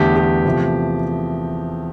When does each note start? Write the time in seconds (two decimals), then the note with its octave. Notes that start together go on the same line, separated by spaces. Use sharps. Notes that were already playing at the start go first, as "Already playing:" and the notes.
Already playing: E2 D3 A3 G4
0.16 G4
0.45 E2 C3 F3 A3